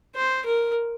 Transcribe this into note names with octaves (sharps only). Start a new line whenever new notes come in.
C5
A#4